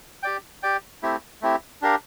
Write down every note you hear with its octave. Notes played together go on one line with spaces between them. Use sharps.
G4 D5 G5
G4 D5 G5
A3 C4 E4 G4
A3 C4 E4 G4
D4 G4 A#4 F5